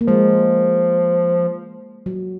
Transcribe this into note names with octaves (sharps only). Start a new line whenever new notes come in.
A#3
F3 G#3
F#3